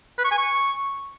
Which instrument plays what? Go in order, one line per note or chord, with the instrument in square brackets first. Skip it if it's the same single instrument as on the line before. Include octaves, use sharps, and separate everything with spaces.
[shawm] B4
C#6
G#5
C#6